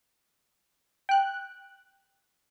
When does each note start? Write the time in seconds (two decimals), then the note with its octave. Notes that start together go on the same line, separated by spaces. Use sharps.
1.09 G5 F#6